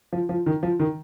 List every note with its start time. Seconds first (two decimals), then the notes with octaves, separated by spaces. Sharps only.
0.13 F3
0.29 F3
0.46 D#3
0.63 F3
0.80 D#3